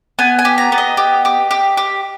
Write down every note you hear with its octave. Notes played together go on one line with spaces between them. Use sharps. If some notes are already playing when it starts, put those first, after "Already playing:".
B3 G#5
G#5
G4
A#5
B3
D#5
G4
G4
G4
G4